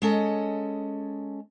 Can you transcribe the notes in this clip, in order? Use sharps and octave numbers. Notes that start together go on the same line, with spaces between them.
G#3 C#4 A4 D#5